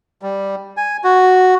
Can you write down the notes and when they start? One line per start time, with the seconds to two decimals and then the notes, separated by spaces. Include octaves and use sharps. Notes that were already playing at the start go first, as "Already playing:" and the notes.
0.22 G3
0.77 G#5
1.04 F#4